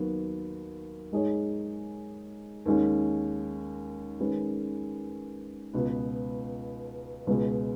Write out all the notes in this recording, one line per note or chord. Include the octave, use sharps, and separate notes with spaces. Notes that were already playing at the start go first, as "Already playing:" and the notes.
Already playing: D#2 D#3 F#3 B3
G#2 G#3 D#4 G#4 C#5
D#2 D#3 G#3 C#4
D#3 G#3 C#4 B4
C#2 B2 B3
C#2 B2 G#3